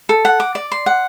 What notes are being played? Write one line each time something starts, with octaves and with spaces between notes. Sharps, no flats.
A4
F#5
D6
D5
C6
F#5